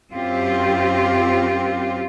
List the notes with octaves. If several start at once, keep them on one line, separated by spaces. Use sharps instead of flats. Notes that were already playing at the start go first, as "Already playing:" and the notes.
F#2 C4 F4 G4